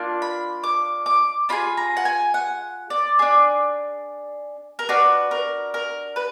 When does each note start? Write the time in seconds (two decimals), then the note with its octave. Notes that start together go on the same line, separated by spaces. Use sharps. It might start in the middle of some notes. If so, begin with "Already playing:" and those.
Already playing: A#3 D4 F4
0.22 B5
0.64 D6
1.06 D6
1.49 D4 F4 G#4 B5
1.77 A#5
1.97 F#5
2.05 G#5
2.34 F#5
2.90 D5
3.19 D4 G#4
4.79 A#4
4.89 D4 F#4 B4
5.31 A#4
5.74 A#4
6.16 B4